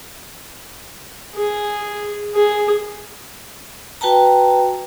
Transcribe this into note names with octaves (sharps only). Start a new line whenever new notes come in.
G#4
G#4
F#4 B4 G5 A5 A#5